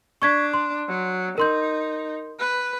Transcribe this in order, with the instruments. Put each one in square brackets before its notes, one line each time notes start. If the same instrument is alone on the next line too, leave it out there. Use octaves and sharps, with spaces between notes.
[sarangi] D4 [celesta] C#6 G#6 B6
[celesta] C6
[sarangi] F#3
[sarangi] D#4 [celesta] A#4 C6 G6
[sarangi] B4